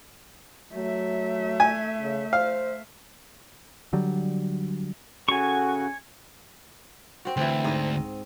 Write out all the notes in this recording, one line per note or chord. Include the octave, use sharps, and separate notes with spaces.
F#3 A3 E5
G#5
C#3
C5 F5
D3 F#3 G3
C#3 F#4 A4 G#5 C#6
C4 F#4
D2 E3 C4
G#2 D#5